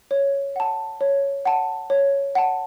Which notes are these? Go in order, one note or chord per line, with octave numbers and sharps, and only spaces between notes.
C#5
F#5 A5
C#5
F#5 A5
C#5
F#5 A5